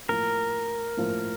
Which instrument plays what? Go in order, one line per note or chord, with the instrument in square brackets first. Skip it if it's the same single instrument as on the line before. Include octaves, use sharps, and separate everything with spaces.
[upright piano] A2 F3 A#3 [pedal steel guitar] A#4
[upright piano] A2 F3 A#3